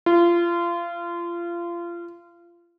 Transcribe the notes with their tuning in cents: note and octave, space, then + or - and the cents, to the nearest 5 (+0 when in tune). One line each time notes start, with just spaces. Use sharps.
F4 -25